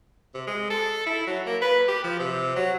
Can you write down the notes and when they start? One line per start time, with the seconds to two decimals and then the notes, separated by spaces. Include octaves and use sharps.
0.34 C3
0.47 G#3
0.70 A4
1.07 E4
1.27 F#3
1.46 A#3
1.62 B4
1.88 G4
2.04 F3
2.20 C3
2.56 F#3